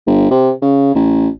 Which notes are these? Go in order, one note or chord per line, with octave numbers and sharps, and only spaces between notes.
G1
C3
C#3
A1